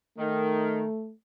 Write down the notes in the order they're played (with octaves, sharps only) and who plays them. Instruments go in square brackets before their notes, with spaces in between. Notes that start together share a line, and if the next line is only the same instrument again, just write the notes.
[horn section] D#3 [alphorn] A3